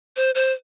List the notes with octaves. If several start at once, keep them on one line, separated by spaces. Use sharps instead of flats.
C5
C5